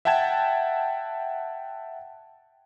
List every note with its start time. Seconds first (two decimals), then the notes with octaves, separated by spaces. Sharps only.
0.05 E5 F#5 G5 A5 G#6 E7